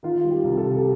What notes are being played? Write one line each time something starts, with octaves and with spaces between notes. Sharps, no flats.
D#3 F4
G3
G4
C2
A4
C3
G4